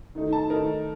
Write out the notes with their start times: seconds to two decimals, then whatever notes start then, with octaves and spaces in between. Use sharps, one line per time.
0.15 D#3 A3 D#4
0.33 A5
0.50 D#3 A3 D#4 A#4